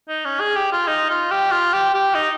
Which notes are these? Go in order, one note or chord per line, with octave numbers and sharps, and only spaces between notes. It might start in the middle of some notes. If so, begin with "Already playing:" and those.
D#4
C#4
G#4
G4
F4
D#4
F4
G4
F4
G4
G4
D#4